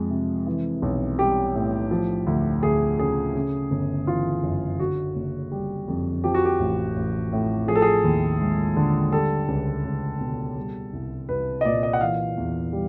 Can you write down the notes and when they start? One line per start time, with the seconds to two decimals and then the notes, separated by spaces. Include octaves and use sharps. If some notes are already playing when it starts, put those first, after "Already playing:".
Already playing: F2 F3 G#3 G#4
0.10 C3
0.47 E3
0.82 B1
1.18 G3 G4
1.55 A2
1.91 F3
2.26 D2
2.63 D2 G#4
2.99 C#3 G#4
3.35 C#3
3.71 G1
4.07 E3 F4
4.43 F#2
4.79 D3 F#4
5.16 F#1
5.52 G3
5.88 F2
6.24 F3 G4
6.34 F#4
6.45 G4
6.60 A1
6.96 A1
7.32 A2
7.67 F3 G#4
7.75 A4
7.82 G#4
8.04 D#2
8.41 G#3
8.76 D3
9.12 G3 A4
9.48 C#2
9.85 C#2
10.21 B2
10.57 G3
10.93 C2
11.29 C2 B4
11.61 D#5
11.65 A#2 D5
11.83 D#5
11.93 F#5
12.01 E3 F5
12.37 E2
12.73 G3